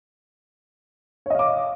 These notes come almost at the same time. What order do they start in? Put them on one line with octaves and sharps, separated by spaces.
C#5 D#5 F5 D6